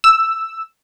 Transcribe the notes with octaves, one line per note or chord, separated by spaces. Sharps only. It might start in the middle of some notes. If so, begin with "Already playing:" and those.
E6